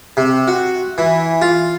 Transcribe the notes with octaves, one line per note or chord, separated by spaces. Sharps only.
C3
F#4
E3
F4